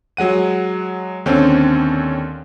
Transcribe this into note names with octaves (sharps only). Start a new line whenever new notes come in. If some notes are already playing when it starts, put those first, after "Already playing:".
F#3 G#3 F#5 D#7
D#2 D3 C4 C#4